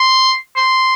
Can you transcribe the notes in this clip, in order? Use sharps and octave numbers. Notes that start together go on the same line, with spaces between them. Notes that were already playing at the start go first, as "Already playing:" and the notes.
Already playing: C6
C6